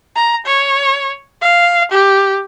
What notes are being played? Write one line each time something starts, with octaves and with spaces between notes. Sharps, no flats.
A#5
C#5
F5
G4